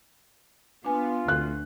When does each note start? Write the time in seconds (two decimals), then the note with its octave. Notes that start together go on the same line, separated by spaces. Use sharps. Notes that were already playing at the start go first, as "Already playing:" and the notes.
0.85 B3 D4 F4 B4 G#5
1.28 D2 F#6